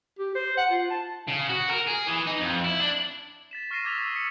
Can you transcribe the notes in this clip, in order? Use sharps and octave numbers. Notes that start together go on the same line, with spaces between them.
G4
C5
F#5
F4
A5
C#3
F#4
A#4
G#4
E3
D#4
F2
E4
D4
A6 B6 E7
C#6 F6 A#6 C7 D#7 E7
D6 E6 G#6 A6 B6 F7
C#6 D#6 E6
D#6 E6 B6 C#7